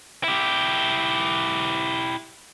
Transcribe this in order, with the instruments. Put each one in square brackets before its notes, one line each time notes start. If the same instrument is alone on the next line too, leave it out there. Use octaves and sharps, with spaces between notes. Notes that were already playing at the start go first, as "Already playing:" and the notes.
[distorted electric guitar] E4 G4